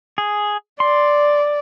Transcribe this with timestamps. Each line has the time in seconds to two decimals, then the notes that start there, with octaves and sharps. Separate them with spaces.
0.18 G#4
0.80 D5 C6